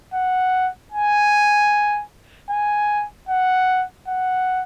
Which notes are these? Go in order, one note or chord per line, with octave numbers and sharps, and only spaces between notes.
F#5
G#5
G#5
F#5
F#5